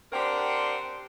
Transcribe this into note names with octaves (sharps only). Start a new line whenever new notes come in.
C4 D4 G4 A#4 F#5 C6